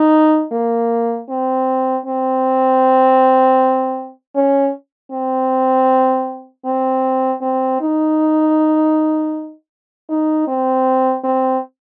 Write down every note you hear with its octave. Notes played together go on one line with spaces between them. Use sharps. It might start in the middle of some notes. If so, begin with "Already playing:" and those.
Already playing: D#4
A#3
C4
C4
C#4
C4
C4
C4
D#4
D#4
C4
C4